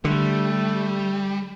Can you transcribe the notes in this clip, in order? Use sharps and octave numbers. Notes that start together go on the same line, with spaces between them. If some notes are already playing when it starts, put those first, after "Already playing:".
D3 G3 A3